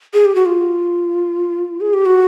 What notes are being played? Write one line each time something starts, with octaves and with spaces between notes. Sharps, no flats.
G#4
G4
F#4
F4
G#4
G4
F#4